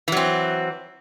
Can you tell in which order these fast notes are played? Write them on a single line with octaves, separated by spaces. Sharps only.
E3 F#3 C4